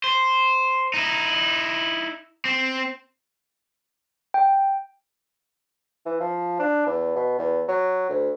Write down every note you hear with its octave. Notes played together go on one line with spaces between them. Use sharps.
C5
D#4 E4
C4
G5
E3
F3
D4
E2
B2
E2
F#3
D2